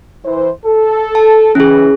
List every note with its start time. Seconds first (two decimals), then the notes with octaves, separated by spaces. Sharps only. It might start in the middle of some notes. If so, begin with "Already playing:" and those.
0.25 E3 C5
0.65 A4
1.15 A5
1.55 E3 C#4 G#4